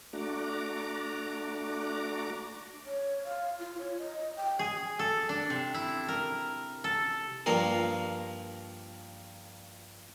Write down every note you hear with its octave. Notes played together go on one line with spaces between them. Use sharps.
A3 D4 F#4 A#5 D6
C#5
F5
F4
C#5
D#5
G5
G#4
A4
D4
C3
E4
A#4
A4
G2 F3 A#3 A#4